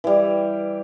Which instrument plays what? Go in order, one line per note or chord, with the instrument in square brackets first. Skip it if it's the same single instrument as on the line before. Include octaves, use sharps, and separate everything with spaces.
[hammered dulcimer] E3 G3